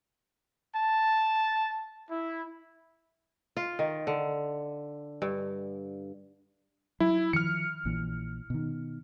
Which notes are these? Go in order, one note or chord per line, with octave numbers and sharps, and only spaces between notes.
A5
E4
F4
D#3
D3
G2
F#3 E4
D#3 F3 F6 C#7
A#1 A#2 E3
B2 D#3